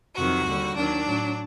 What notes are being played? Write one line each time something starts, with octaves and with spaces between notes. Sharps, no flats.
F2 C3 D#3 F#3 F#4
D#2 D3 G3
D#2 D#3 F#3 D4
A2 F#3